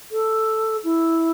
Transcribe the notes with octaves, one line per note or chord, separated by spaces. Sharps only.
A4
E4